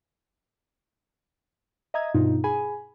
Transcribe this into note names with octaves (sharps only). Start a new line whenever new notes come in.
D#5 E5 A#5 D#6 G#6
G2 B2 D#4 F4
G#4 G#5 B5